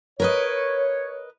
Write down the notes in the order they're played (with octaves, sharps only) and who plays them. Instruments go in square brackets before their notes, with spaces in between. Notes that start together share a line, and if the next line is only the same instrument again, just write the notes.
[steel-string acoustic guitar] A#4 B4 D#5 [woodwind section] C#5